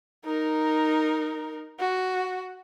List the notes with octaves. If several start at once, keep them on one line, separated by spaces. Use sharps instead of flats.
D#4 A#4
F#4